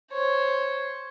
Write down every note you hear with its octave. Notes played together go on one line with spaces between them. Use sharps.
C5 C#5